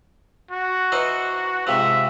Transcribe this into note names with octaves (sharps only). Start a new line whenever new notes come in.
F#4
E3 D#4 C5
G#2 C3 F3 E5